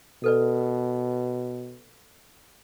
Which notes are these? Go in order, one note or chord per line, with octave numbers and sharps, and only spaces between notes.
B2 A4 B4 D5